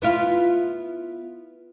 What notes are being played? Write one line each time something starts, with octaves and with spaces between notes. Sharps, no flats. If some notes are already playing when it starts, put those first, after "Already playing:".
B3 E4 F4